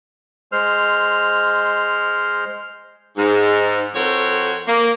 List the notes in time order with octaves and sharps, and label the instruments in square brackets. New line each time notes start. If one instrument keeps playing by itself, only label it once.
[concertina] G#3 C5 F6
[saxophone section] G#2
F2 F#4 A4 A#4 C5 C#5
A#3